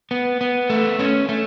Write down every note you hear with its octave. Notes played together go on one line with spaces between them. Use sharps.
B3
B3
A3
C#4
A3